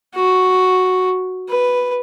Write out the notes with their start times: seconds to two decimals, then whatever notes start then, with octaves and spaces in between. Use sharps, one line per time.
0.15 F#4
1.49 B4